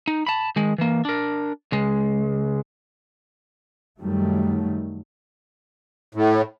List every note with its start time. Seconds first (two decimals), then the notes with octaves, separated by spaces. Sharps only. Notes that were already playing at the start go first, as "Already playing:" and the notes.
0.08 D#4
0.27 A5 B5
0.56 D#3 G#3
0.78 E3 A#3
1.05 D4 A#4
1.72 C#2 G#3
4.00 F#2 D#3 F#3 G3 A3
6.15 A2